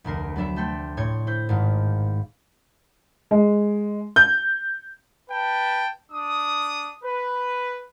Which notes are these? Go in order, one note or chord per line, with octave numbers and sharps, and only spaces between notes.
F1 D2 A#4 C7
F#3 B3 D4 E5
A3 A4 G5 C6
A2 C#5 C6 G#6
E4 C5 G6
G#1 G#2 F5
G#3
G6
B4 G5 A5
D4 D#6
B4